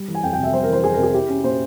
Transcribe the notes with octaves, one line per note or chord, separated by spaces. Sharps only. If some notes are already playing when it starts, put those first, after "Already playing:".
Already playing: G3
E3
G#5
F2 G5
C3 G5
E5
G3 C5
A#4
E3 C5
F2 G#4
C3 A#4
G#4
E4 G4
C#4
A#2 C5